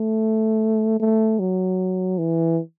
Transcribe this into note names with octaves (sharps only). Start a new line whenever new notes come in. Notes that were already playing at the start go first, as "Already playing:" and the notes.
Already playing: A3
A3
F#3
E3